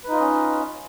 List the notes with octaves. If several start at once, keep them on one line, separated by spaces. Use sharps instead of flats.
C#4 D#4 F4 B4 D#5